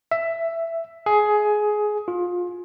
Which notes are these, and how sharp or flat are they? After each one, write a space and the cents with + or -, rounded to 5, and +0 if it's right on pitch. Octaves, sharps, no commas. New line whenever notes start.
E5 +10
G#4 +15
F4 +25